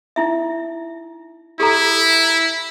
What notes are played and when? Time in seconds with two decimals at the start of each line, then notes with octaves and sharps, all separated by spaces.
0.16 D#4 E4 E5
1.60 E4 G4 A4 A#5